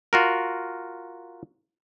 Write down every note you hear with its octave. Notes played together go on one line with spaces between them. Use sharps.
F4 F#4 A#4